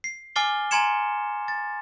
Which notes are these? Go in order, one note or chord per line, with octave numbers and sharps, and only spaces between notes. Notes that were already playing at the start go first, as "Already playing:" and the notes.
C7
G#5 D6 F6 A6 C7 G7
G#5 A#5 C6 G#6 C#7 E7
A6